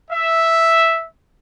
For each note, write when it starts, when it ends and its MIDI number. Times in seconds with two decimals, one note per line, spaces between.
0.11 1.07 76